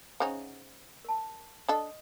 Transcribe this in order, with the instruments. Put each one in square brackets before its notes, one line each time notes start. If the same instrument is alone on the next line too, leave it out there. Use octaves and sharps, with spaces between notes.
[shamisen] C#3 C#4 D#4 [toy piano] C5 E5 F#5
[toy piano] A#4 A5
[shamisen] D4 A4 [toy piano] D#5 D#6